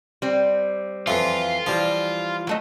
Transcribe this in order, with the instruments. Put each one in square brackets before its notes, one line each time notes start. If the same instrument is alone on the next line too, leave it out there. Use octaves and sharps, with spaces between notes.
[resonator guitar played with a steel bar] G3 C4
[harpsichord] F2 E3 [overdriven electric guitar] F4
[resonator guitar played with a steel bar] E3 G3 [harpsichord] F3
[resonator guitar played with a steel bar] F#3 A3 D#5